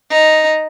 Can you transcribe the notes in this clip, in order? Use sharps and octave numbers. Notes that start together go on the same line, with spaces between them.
D#4